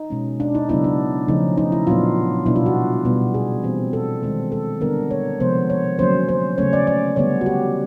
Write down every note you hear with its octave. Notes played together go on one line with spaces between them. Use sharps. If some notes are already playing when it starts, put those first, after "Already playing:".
Already playing: D#4
B2 G#3 C#4
D4
D#4
C#3 F#3 B3 D4 E4
D4
C#3 F3 A3 C#4 D#4
D#4
E4
A#2 F#3 B3 D4 F4
B2 G3 B3 D4 E4
F4
F#4
B2 G3 B3
G#4
E3 G3 C4
A4
D#3 G#3 C4
A4
D3 G3 B3 D4 A#4
C#5
C3 F3 G#3 B3 C5
C#5
D3 F#3 A#3 C#4 C5
C5
C#3 F#3 A3 C#4 C#5
D5
D5
D3 G3 B3 C#5
F#4
G4